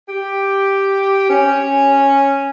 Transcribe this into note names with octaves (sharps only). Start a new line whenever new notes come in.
G4
C#4